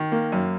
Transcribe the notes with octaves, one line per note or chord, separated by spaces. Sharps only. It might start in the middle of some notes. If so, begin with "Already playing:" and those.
Already playing: D#3
A#3
F#2